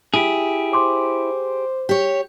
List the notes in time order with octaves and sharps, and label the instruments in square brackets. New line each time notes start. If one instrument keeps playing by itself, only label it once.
[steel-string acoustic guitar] E4 [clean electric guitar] G4 G#4
[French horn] C5 [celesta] C6 D6
[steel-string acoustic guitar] G4 C#5